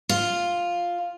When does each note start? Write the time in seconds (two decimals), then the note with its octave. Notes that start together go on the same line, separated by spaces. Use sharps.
0.09 F4